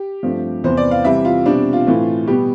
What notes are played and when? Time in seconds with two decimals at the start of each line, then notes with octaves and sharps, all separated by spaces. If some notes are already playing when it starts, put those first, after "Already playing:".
Already playing: G4
0.23 G2 F3 A3 C4
0.64 E2 C3 E3 B3 C5
0.77 D5
0.91 F5
1.05 C3 E3 G3 C4 E5
1.25 F4
1.46 B2 G3 C4 D4
1.73 F4
1.87 A2 E3 A3 C4
2.27 B2 G3 B3 G4